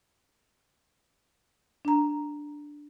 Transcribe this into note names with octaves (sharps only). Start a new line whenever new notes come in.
D4 A#5